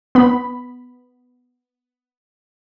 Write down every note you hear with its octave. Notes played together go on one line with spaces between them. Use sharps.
B3 B5